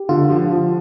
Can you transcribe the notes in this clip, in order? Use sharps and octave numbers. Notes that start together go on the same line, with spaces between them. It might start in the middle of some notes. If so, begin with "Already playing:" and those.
Already playing: G4
D3 F4
F3
F3